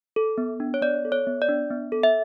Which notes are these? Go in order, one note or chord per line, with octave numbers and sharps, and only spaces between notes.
A4
B3
D4
C#5
B3 D5
A4
C#5
B3
D5
D4
B3
A4
E5